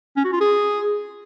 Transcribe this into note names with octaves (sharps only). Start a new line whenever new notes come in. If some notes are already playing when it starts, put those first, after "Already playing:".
C#4
F#4
F4
G#4